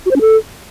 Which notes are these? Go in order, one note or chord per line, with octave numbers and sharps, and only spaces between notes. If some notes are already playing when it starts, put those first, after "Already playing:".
F#4
C5
C#4
A4